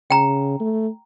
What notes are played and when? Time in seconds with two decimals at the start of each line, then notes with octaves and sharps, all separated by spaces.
0.10 C#3 G5 A#5
0.60 A3